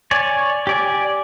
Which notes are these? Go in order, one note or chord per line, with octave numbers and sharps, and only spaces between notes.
C#5 D5 G#5
G4 D5 G#5